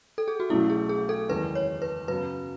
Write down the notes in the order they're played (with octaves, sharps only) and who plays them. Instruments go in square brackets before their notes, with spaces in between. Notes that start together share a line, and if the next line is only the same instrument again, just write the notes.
[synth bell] A4
G#4
F#4
[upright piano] B1 B2 A3 C#4 [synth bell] E4
[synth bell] G#4
G#4
A4
[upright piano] F#1 E2 D#3 G#3 [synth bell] B4
[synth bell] C#5
B4
[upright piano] F#2 C#3 F#3 B3 [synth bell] B4